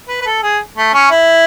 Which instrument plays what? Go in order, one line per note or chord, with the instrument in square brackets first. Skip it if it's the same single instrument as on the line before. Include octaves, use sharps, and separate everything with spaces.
[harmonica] B4
B4
A4
G#4
A3
C#4
E4